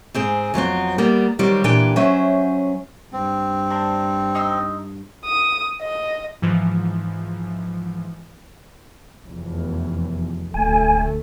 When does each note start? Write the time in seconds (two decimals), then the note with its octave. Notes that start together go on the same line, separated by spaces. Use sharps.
0.14 G#2 C4 G#4
0.54 F2 F#3 B3 C4
0.98 G3 A#3 B3
1.39 D#3 F#3 G3 C4 G4
1.64 A#2 E3 D4 G4 B4 G5
1.96 F#3 C#4 C5 E5
3.13 G2 C4
3.70 D4 A#4 C5
4.35 D#4 C6 E6
5.26 D#6
5.82 D#5
6.42 G#2 E3 F3
9.25 F1 E2
10.54 D#1 D2 A3 G#5